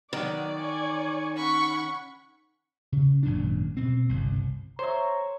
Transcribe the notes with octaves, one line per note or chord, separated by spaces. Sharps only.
D#3 F#3 B3 D5
C#5 G#5
C#4 F#5 B5 C#6
C#3
G#1 F#2 A#2 D4
B2 C4
G1 C2
C5 C#5 E5 A#5